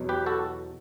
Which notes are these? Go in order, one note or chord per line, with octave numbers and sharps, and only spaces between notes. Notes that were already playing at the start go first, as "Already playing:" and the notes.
Already playing: E2 B2 F#3
G4 B4
F#4 A4